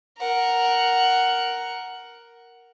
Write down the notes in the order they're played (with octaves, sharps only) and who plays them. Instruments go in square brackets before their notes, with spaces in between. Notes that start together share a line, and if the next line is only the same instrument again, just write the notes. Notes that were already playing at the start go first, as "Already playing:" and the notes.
[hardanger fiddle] A#4 F#5